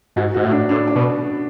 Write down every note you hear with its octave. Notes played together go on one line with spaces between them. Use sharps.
G#2 F#4
G#2 F#4
A2
D4
A2 D4
D4
B2